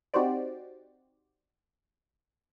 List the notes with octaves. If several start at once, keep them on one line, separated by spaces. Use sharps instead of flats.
C4 D#4 F#4 G4 C5 D5